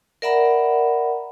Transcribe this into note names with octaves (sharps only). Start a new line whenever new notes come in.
A#4 D5 E5 F#5 A#5 B5